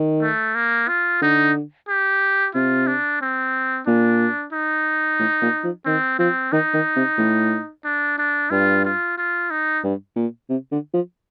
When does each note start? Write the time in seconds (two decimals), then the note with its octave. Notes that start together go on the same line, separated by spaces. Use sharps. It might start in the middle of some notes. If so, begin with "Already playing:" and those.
Already playing: D#3
0.22 A3
0.55 A#3
0.88 F4
1.21 D3 D#4
1.88 G4
2.54 C3 F4
2.87 D4
3.21 C4
3.86 A#2 D4
4.53 D#4
5.19 A2
5.42 A#2
5.64 F3
5.85 D#3 C4
6.19 F3 C4
6.52 D#3 D#4
6.74 D#3
6.96 C3
7.18 A2
7.84 D4
8.18 D4
8.50 G2 F4
8.84 F4
9.18 F4
9.51 D#4
9.84 G2
10.16 A#2
10.49 C3
10.72 D3
10.94 F3